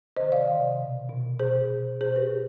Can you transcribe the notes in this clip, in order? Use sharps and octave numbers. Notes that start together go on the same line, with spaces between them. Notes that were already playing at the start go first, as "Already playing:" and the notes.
C3 D#3 C5 D#5
D5 F5
C3 D#3
B2
B2
B2 G#4 C5
B2
B2 G#4 C5
G4 B4
B2